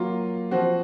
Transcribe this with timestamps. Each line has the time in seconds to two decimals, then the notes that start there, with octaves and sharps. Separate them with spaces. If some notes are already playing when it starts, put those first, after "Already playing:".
Already playing: F#3 A#3 F4
0.51 F3 C4 F#4